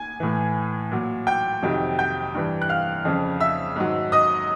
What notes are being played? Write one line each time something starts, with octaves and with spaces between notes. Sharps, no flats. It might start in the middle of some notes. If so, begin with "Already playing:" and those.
Already playing: G#5 G#6
A2 E3
A#2 F#3
G5 G6
F2 C3 D#3 F#3
G5 G6
G2 E3
F#6
F5 F6
F2 C#3 F3
E5 E6
G#2 D#3 F#3
D#5 D#6